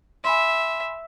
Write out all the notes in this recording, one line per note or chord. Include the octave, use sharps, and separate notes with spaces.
E5 G#5 B5 C6